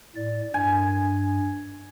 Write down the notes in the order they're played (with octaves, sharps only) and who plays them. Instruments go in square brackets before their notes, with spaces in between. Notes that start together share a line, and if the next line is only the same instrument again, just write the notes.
[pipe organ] A2 D5
[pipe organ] G2 [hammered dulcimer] G#5